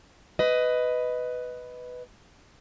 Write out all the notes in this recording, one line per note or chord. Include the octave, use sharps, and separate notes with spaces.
B4 D#5